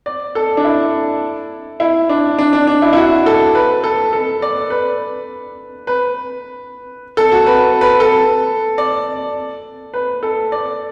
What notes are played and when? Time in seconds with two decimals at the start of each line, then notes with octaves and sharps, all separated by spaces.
0.06 D5
0.35 A4
0.57 D4
0.64 E4
1.80 E4
2.09 D4
2.39 D4
2.53 D4
2.67 D4
2.82 E4
2.93 E4
2.97 F#4
3.26 A4
3.55 B4
3.84 A4
4.13 A4
4.42 D5
4.70 B4
5.87 B4
7.17 A4
7.32 F#4
7.46 B4
7.81 B4
8.00 A4
8.78 D5
9.94 B4
10.23 A4
10.52 D5